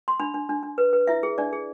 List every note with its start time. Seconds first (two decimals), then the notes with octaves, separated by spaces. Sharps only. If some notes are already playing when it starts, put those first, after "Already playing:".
0.08 C6
0.20 D4 B5
0.34 D4
0.49 D4
0.63 D4
0.78 B4
0.93 B4
1.07 E4 E5
1.23 G#4
1.38 D4 D5
1.53 G#4